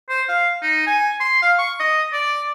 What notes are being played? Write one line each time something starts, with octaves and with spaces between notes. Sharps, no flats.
C5
F5
D#4
G#5
C6
F5
C#6
D#5
D5